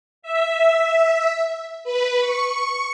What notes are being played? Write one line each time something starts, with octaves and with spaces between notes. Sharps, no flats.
E5
B4
C#6